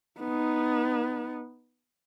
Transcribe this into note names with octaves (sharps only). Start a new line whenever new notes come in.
B3 D#4